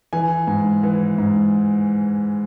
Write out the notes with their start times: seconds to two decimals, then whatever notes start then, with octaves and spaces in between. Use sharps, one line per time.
0.13 E3 G#5
0.47 G#2
0.83 E3
1.18 G#2